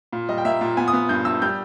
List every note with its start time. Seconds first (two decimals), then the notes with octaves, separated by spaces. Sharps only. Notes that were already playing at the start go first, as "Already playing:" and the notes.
0.12 A#2
0.29 G3 D#5
0.38 G5
0.45 A#3 E5
0.61 A#2
0.77 B3 G#5
0.88 D#6
0.93 B3
1.09 G2 G6
1.25 G2 E6
1.42 G3 G6